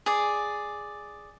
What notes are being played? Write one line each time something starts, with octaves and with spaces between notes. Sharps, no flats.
G#4 D5